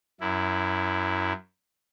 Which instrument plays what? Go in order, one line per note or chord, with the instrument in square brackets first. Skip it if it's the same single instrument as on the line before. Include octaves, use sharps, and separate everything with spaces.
[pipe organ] F#2 E4